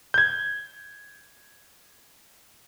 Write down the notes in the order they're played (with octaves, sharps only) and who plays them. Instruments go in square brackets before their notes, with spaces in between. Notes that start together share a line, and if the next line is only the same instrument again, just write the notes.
[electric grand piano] G6 G#6